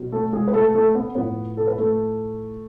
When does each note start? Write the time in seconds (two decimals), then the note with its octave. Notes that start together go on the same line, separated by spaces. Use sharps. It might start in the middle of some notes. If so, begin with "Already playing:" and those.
Already playing: B2 F#3
0.12 A3 A4
0.33 G#3 G#4
0.48 B4
0.54 A3 A4
0.74 A3 A4
0.95 B3 B4
1.15 A2 F3 B3 B4
1.57 A4
1.67 B4
1.78 A3 A4